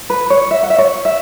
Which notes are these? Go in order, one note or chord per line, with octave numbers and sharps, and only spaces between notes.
B4
C#5
E5
F#5
E5
C#5
E5